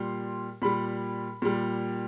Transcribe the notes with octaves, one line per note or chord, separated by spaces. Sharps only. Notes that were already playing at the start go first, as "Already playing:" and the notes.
Already playing: A#2 G3 C6
A#2 G3 B5
A#2 G3